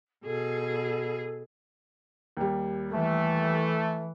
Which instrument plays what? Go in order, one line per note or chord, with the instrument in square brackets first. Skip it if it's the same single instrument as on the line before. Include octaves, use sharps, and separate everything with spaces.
[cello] B2 G#4 [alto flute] A4
[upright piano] D#2 G3
[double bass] E3 [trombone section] A3